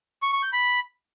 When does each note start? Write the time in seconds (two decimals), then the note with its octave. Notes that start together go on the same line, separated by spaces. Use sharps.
0.22 C#6
0.33 C#6
0.43 G6
0.53 B5